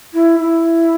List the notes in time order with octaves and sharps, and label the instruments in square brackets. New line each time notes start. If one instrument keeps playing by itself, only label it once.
[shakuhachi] E4
E4